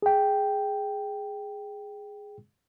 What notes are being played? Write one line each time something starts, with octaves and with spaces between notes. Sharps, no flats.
G#4 G5